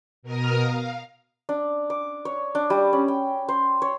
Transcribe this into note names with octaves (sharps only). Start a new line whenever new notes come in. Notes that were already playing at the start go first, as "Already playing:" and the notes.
B2 A#4 A#5 D#6 F6
F5
D4
D6
C#5
D4
G3
C#4
G5
C5
C#5